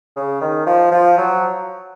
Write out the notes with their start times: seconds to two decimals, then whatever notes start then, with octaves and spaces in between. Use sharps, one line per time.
0.16 C#3
0.41 D#3
0.66 F3
0.91 F3
1.18 F#3